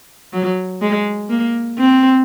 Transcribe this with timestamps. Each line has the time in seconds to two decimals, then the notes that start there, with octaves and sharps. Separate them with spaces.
0.33 F#3
0.81 G#3
1.30 A#3
1.78 C4